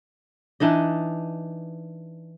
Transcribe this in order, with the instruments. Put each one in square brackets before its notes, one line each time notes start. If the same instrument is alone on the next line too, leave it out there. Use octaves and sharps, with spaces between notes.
[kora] E3 D4 D#4 D#5